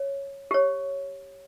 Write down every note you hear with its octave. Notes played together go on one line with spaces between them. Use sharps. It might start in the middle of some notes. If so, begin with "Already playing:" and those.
Already playing: C#5
G4 C#5